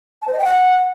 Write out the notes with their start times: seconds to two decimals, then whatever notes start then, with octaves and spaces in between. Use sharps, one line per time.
0.22 A5
0.27 C5
0.33 D#5
0.38 G5
0.44 F#5